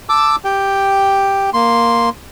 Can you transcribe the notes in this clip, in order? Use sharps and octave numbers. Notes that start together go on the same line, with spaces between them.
A5 D6 E6
G4 G5
A#3 C6